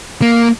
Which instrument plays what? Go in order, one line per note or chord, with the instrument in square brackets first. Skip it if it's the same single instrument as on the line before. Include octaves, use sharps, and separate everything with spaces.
[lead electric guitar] A#3